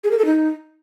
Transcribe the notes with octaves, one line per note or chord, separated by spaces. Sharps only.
G#4
A#4
A4
D#4